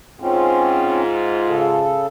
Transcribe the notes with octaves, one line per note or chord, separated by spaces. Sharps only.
G#2 C4 C#4 F4
C#3 A4